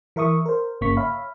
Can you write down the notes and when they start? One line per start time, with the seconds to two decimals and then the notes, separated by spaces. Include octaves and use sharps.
0.16 E3 A#4 E5 C#6 D#6
0.46 A#4 C5
0.81 G1 C#3 A#3 C#6 B6
0.97 C#5 E5 F5 B5